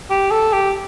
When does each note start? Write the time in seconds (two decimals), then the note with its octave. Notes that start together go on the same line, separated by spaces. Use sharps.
0.10 G4
0.31 A4
0.53 G4